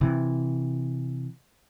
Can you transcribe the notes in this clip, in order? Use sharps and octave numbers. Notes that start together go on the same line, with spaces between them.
C3 E3